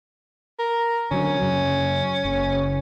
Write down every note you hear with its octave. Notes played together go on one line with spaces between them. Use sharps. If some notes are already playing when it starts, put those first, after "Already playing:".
A#4
D3 F#3 C#4
F#2 C#3 F#3
F#1 C#3